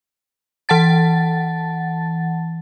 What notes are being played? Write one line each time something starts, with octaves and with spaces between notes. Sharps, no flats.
E3 F#5 A5 A6